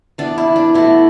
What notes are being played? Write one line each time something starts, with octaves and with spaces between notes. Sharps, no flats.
E3 B3 D4
E4
D4
B2 A3 E4